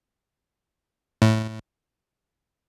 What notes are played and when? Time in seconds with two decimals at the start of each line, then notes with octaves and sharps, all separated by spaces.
1.22 A2